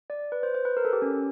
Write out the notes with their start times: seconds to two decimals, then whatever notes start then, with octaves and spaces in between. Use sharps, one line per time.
0.10 D5
0.32 B4
0.43 C5
0.54 C5
0.65 B4
0.77 A#4
0.85 A4
0.93 G4
1.02 C#4